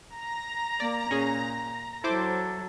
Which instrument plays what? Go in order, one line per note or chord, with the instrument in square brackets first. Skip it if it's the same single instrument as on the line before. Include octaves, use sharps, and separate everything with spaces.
[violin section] A#5
[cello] A#3 [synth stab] D5
[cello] A#2 [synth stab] C#4 G#4
[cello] F#3 A4 [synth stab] E4 C5 D6